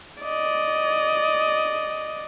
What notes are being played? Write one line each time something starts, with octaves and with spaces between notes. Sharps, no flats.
D5 D#5